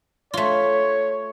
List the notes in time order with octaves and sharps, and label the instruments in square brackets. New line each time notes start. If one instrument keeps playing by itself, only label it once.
[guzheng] A3 F4 [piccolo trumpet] C#5